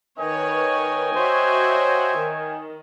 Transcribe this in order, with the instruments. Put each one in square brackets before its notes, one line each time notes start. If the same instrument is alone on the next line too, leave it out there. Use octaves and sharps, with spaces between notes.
[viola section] D#3 B4 C#5 [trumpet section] D#5 G5 G#5
[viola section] F#4 C#5 E5 [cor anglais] C5
[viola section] D#3